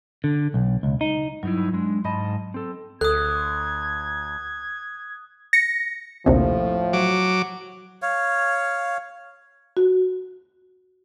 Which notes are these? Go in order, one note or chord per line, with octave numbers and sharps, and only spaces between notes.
D3
B1
C#2
D#4
G2 F#3 D#4 E4
G#3 D4
G#2 D#5 A5 B5
C4 A4
D2 A4 D#6 F#6 G#6
A#6 C#7
A#1 D#2 A2 C3 F3
F#3 D6
C#5 F5
F#4